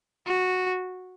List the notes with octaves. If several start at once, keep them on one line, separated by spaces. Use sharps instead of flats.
F#4